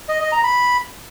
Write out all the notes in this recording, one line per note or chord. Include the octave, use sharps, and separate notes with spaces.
D#5
D#5
A#5
B5